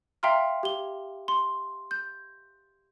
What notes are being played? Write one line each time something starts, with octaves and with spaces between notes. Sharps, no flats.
E5 F5 G5 A#5 C6 F6
G4 G7
C6
G6